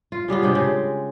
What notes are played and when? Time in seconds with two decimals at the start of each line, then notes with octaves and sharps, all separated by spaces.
0.12 F4
0.28 C#3 G3 B3 F4
0.42 C3 G#3 D4 G5
0.55 C#3